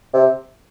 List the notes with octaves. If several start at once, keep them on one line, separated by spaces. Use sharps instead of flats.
C3